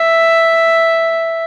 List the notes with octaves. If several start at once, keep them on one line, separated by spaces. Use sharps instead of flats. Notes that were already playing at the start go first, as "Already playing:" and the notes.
Already playing: E5